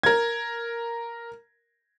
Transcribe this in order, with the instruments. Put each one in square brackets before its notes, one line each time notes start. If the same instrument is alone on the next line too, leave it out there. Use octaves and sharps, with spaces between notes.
[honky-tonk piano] A#4 G#6